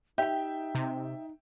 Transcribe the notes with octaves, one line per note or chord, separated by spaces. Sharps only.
D#4 G4 E5 G5
C3